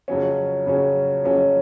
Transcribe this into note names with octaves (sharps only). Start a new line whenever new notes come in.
F2 C#3 F#3 C#4
F2 C#3 F#3 C#4
F2 C#3 F#3 C#4